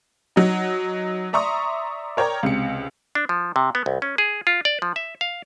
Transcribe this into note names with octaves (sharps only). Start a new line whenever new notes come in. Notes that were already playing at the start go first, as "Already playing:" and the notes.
F#3 D#4
D5 E5 A#5 C6 C#6 D#6
A#4 C#5 D5 G5 A#5
C#2 C3 C#7
D4
F3
C3
B3
C2
C#4
G#4
F4
D5
F3
E5
F5